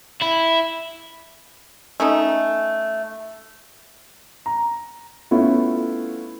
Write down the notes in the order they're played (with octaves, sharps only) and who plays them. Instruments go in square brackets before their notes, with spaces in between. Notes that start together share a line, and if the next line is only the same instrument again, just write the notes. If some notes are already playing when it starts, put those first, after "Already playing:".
[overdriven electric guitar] E4
[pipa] A3 C#4 D#4
[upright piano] A#5
A3 B3 C#4 E4 F4